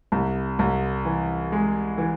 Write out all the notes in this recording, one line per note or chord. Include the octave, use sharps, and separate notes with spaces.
C2
C2
E3
G#3
E3